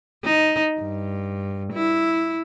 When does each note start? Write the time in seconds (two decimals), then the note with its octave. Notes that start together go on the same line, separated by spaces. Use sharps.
0.24 D#4
0.81 G2
1.73 E4